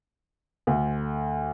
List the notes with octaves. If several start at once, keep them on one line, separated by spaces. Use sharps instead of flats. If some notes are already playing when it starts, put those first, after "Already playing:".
D2